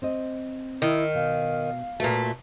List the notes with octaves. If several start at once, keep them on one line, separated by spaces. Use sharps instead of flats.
C4 C5 D#5
D#3 E4
B2 F5
A#2 A3 F#4 B4 G#5